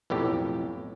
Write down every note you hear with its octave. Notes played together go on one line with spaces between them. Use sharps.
B1 F2 A2 G4